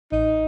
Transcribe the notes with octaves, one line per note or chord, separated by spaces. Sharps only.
A1 D#4